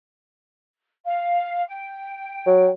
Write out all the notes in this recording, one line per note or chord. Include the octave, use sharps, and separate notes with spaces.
F5
G5
F#3